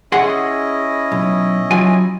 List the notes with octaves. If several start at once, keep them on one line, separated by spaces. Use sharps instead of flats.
C#4 E4 G#4 D#5 F#5 C6
B1
F#3 F4 G#5